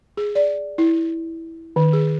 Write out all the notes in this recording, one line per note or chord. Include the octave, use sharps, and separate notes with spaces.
G#4
D5
E4
D#3
G#4